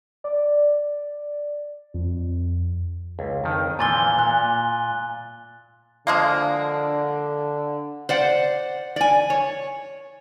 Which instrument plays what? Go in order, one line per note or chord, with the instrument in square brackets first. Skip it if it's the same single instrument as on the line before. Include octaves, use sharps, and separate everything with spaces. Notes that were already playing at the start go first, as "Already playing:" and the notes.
[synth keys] D5
F2
[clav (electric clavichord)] C#2
F2 D#3
[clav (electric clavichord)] A#2 E3 F3 [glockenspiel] G#5 A6 G7
[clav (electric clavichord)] A#2 [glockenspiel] F#6
[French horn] D3 [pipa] F3 G#3 A#3
[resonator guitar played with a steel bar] C5 D5 F#5
D5 G#5
C#5